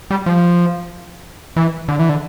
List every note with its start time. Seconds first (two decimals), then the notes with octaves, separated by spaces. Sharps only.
0.11 G3
0.26 F3
1.56 E3
1.88 D3
1.99 E3
2.09 D3